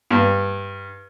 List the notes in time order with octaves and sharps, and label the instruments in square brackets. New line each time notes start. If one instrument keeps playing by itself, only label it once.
[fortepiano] G2